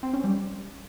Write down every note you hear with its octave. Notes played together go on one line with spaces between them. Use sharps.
C4
C#4
G3